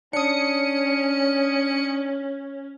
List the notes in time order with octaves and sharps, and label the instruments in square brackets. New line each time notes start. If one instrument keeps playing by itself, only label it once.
[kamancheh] C#4 [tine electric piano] D4 [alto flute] C#5 [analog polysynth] D#6 C#7